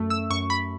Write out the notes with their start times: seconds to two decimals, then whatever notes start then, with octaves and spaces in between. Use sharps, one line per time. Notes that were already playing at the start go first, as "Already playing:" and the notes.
Already playing: F#2 A3
0.10 E6
0.30 F#2 C#6
0.50 B5